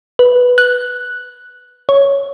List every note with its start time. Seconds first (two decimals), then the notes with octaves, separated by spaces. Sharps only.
0.19 B4
0.58 F#6
1.89 C#5